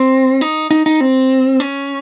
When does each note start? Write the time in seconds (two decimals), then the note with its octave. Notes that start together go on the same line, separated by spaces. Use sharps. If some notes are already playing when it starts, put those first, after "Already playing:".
Already playing: C4
0.41 D#4
0.71 D#4
0.86 D#4
1.01 C4
1.60 C#4